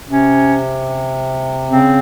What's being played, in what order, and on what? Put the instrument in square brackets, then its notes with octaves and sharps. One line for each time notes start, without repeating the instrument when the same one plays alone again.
[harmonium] C3 [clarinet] C#4
[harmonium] C#3 [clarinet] C4